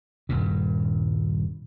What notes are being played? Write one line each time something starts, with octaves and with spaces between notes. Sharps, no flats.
D#1 G2 A#2